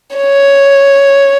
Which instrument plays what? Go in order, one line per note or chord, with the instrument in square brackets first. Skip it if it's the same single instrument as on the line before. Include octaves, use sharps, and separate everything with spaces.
[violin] C#5